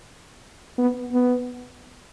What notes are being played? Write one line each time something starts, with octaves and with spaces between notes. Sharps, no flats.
B3
B3